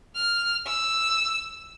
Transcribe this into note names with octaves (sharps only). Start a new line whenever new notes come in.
F6
E6